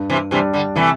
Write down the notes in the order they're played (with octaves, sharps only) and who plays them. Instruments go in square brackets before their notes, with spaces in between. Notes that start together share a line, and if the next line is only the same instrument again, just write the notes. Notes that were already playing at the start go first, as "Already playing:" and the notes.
Already playing: [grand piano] G2
[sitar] C3 E3
[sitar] C3 E3 [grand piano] G3 D4
[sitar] D3 G3
[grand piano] C3 [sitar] E3 A3